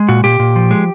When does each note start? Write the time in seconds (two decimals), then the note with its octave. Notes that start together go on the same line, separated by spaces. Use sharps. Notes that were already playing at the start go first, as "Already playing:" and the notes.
Already playing: G#3
0.09 A#2 F#4
0.24 A#2 G4
0.39 A#2
0.56 F3
0.71 G#3